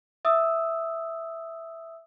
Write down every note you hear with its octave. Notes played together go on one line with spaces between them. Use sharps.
E5 D#6 E6